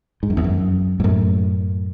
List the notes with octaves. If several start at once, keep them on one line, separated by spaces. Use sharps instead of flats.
G#2
F#2
E2
F#2
G#2
F#2 A2